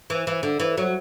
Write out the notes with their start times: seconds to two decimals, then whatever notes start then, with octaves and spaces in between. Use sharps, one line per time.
0.10 E3
0.27 E3
0.43 D3
0.60 E3
0.78 F#3